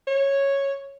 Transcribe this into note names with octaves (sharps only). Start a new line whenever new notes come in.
C#5